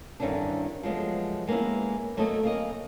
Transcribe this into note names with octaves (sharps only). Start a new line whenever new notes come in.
E2 G2 D3 D#3 C#4 D4
F3 F#3 G#3 A3 B3
G#3 A#3 B3 C#4 E4
F#3 A3 A#3 A4 D#5
C#3 A#3 D#5